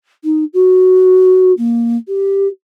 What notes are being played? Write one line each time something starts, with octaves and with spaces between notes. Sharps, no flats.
D#4
F#4
A#3
G4